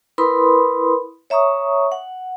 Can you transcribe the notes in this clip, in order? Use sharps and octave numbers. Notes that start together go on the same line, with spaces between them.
E4 A#4 B4 B5 C6 D#6
C#5 E5 A#5 C#6 D#6
F#5